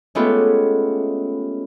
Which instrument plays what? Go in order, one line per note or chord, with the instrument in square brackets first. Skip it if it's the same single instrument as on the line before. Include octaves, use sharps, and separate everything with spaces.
[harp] G#3 A3 B3 C#4 F4 G4